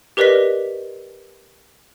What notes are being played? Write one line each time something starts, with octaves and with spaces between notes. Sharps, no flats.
G4 A#4 B4 D5 D#5 B6